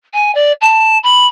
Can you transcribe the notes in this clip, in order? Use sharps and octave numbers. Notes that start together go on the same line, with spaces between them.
G#5
D5
A5
B5